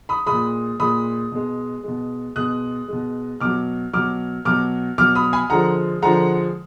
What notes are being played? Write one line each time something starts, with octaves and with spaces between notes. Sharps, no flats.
B5 D#6
A#2 G#3 B5 D#6
A#2 G#3 B5 D#6
B2 G#3
B2 G#3
B2 G#3 D#6 F#6
B2 G#3
B2 F#3 D6 F6
B2 F#3 D6 F6
B2 F#3 D6 F6
B2 F#3 D6 F6
B5 D#6
G#5 B5
D3 F3 G#3 F#5 A#5
D3 F3 G#3 F#5 A#5